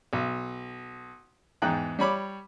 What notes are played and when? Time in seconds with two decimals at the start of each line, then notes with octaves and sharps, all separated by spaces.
0.13 B1
1.62 E2 G#2 D#4 G5 F#6
1.99 G3 C#5 B5 D6